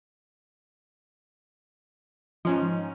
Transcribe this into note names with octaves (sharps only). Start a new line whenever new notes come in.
G#2 F3 C#4 D#4